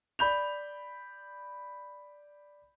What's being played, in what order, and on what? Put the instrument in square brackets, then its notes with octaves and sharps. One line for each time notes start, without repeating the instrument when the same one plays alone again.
[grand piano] D5 B5 G6 F7